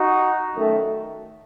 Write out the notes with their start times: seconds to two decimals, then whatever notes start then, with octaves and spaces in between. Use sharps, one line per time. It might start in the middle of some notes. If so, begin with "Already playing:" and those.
Already playing: D#4 F#4
0.55 F#2 D#3 A3